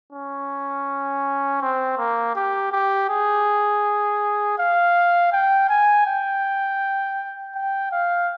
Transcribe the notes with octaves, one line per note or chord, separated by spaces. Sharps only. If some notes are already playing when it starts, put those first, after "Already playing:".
C#4
C4
A#3
G4
G4
G#4
F5
G5
G#5
G5
G5
F5